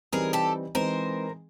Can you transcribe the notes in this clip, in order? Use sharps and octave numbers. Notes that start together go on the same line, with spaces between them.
E3 G3 C4 D#4 G#4 A#4
G4 A4
E3 G#3 C4 D#4 G#4 A#4 C5